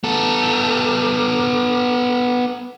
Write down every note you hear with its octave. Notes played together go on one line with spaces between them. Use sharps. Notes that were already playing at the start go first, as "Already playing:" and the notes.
B3 A4